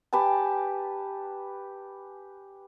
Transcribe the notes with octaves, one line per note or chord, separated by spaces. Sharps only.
G4 B4 G#5 A5